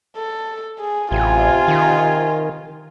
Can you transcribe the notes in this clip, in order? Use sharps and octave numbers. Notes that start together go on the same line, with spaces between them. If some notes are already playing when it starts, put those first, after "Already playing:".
A4
G#4
A1 C3 F4 G#5
D#3